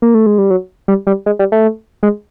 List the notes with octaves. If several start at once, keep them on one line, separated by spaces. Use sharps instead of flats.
A#3
A3
G#3
G3
F#3
G3
G3
G#3
G3
A3
G#3